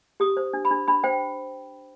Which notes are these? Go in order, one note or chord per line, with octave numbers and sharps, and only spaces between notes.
G4 D#6
C5
D4
B5
D4
D4 B5
C5 G5